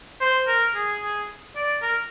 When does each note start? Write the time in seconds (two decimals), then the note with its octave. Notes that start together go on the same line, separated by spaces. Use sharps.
0.21 C5
0.48 A#4
0.75 G#4
1.02 G#4
1.56 D5
1.82 A#4